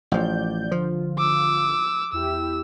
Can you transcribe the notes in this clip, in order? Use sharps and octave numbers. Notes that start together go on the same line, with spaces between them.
A1 F3 D5 G6
G#1 D3 F3 F4
D6 E6
E2 E4 G4 E6